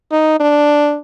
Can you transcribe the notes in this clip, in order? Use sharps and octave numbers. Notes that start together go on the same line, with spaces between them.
D#4
D4